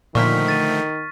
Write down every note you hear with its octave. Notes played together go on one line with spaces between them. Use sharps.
A#2 D3 D#3 F3 A3 C#6 F6 B6
A6 D#7